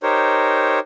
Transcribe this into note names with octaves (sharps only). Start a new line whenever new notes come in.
D#4 G4 A#4 C5 C#5